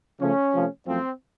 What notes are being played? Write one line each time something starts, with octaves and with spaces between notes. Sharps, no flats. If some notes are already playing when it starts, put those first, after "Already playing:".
C#3 F3 A3 C#4
C3 F3 A3
F#2 F3 A3 C4